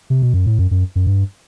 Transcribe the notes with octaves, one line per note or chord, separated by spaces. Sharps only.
C3
B2
F#2
A2
F#2
F#2
F#2
G2